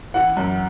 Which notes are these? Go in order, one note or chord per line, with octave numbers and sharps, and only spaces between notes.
E3 F#5
F#2